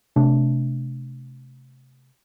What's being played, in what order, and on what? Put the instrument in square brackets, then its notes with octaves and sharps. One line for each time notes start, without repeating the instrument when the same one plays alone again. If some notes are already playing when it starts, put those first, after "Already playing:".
[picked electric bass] C3 A3 D4